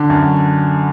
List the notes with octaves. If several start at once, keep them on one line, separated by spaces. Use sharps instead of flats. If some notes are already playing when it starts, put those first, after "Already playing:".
Already playing: D3
F#2